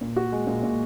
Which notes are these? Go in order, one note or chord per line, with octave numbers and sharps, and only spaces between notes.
A#2
F#4
G#3
A#2
A#2